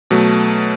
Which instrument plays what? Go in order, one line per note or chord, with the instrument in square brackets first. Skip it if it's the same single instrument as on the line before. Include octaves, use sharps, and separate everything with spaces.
[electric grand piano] B2 F#3 A3